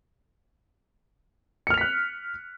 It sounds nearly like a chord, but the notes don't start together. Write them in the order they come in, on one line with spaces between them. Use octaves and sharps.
C#7 F6 F7 B6 F#6